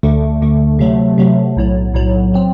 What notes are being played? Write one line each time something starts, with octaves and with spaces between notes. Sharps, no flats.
D2 D3 A3
D2 D3 A3
C3 F#3 A3
C3 F#3 A3
B1 A2 F#3
B1 A2 F#3
F#3 C4